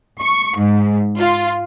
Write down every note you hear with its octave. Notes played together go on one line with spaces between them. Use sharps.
C#6
G#2
F4